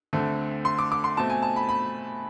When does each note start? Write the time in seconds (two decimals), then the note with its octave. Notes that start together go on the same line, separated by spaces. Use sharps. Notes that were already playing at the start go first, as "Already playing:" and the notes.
0.13 D2 D3 A3 C4
0.65 C6
0.79 D6
0.92 D6
1.04 C6
1.17 B2 A3 C4 A5
1.30 G#5
1.43 A5
1.56 B5
1.69 B5